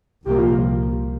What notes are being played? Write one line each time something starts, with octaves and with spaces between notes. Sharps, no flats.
C2 A#2 F3 A#3 G4
F4